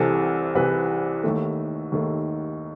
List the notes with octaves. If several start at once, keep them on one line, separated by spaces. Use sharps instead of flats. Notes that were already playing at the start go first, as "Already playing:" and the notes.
Already playing: C2 C3 E3 A4
C2 C3 E3 B4
D#2 D#3 A3
D#2 D#3 A3